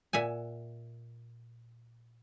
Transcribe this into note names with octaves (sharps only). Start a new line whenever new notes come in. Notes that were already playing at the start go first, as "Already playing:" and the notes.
A#2 E5 F#5 G#5